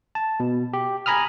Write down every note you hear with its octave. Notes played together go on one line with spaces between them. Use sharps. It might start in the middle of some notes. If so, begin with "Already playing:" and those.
A5
B2
G4
G#5 A#5 B5 D#6 F6